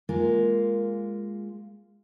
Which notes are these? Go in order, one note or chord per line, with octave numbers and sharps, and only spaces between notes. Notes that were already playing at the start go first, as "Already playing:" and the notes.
G#3 A#3 F4 A#4